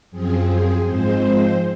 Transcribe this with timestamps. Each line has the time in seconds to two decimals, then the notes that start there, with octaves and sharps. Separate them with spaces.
0.11 F#2 F3 C4 G#4
0.47 G#4
0.84 G#2 F3 G#3 C4 C5